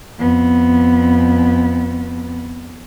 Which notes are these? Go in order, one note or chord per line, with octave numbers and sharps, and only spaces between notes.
F2 B3